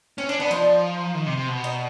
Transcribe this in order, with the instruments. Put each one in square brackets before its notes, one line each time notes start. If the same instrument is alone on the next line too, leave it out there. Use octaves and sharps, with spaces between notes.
[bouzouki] C4 [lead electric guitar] C#4
[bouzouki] C#4 [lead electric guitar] D4
[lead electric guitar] B3 [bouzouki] D4
[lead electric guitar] F3 [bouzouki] D#4
[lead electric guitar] D#3
C3
C3
B2
[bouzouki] D#4